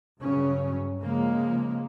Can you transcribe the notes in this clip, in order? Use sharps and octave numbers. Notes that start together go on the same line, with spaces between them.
G2 C#3 F#3 C#4
C#3 F3 G#3 A#3